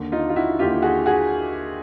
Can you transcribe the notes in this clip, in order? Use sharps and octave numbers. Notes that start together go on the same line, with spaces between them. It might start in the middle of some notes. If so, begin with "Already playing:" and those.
Already playing: D#2 D3
D#4 F4
F4
E4 F#4
D#2 D3 F4 G4
F#4 G#4
F#4 G#4